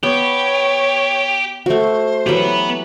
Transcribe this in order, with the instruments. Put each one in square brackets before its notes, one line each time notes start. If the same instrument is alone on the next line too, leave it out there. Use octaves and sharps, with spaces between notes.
[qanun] B3 [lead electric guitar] G4 [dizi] C#5
[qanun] A3 F#4 [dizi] C5
[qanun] E3 F#3 G4 [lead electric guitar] B3 B4